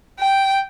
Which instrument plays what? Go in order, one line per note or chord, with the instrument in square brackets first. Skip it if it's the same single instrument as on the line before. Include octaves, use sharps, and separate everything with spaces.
[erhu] G5